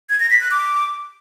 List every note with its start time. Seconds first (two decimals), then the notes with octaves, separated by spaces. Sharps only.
0.10 G#6
0.20 A#6
0.30 B6
0.41 F#6
0.51 D6